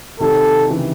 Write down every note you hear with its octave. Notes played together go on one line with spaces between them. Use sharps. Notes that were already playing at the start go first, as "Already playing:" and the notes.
C3 D#3 A4
C#3 E3